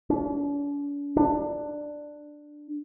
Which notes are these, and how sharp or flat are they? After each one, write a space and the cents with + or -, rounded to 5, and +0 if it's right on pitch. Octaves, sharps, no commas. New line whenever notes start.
D4 -45
D4 +10